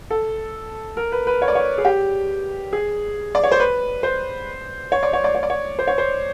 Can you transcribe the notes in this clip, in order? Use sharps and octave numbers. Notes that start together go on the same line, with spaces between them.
A4
A#4
B4
B4
C#5
D5
C#5
G#4
G4
G#4
D5
C#5
C5
B4
C5
C#5
D5
C#5
D5
C#5
D5
C#5
C5
C#5
C5